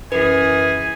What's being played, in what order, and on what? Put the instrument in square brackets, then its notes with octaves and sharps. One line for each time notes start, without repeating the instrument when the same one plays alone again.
[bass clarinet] F#2 [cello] E3 G#4 [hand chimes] B4 [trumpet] G#5